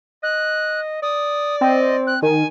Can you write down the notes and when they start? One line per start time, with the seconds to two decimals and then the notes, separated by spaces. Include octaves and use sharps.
0.23 D#5 F#6
1.02 D5 D#6
1.61 C4 D#5
2.07 F#6
2.22 D#3 G#5